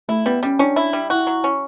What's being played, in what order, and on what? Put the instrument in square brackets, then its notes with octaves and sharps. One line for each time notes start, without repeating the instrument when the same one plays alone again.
[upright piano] A3 [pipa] E4
[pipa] G3 [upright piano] B3
[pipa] G3 [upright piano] C#4
[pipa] C#4 [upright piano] D4
[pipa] E4
G3
[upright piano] E4 [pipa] F#4
[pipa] F#3
C#4